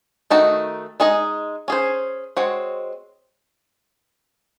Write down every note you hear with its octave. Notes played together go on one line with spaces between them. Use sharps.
D#3 A3 D#4 F#4
G#3 D#4 G#4 D#5
C#4 G#4 C5
G#3 C4 F#4 C#5